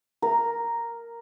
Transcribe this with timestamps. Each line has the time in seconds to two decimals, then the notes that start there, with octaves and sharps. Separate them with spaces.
0.22 A#4